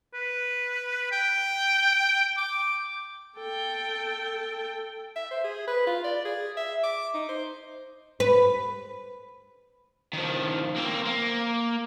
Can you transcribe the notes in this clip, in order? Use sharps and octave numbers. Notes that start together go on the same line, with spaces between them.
B4
G5
D6
A4 G5
E5
C5
G#4
B4
F4
D5
G#4
E5
D6
D#4
C5
B4
D#3 F3
A#3 C4
A#3